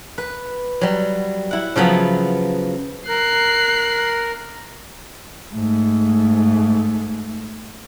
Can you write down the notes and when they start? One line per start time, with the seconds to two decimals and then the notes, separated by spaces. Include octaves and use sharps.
0.18 B4
0.81 F#3 G3
1.51 E4 F#5
1.76 C#3 F3 F#3 B3 B5
3.08 A#4 F#6 C7
5.54 G#2 A3